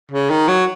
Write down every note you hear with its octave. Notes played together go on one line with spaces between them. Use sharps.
C#3
D#3
F#3